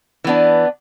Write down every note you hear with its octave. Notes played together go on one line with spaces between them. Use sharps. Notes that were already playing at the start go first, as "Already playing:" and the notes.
E3 B3 D4